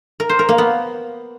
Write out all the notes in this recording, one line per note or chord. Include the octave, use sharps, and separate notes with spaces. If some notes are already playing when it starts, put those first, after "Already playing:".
A#4
C5
A#4
A#3
B3